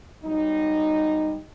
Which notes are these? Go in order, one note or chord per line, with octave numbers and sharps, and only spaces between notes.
F#3 G3 B3 D#4